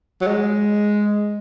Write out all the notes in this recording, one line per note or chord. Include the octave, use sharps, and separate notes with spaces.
F#3
G#3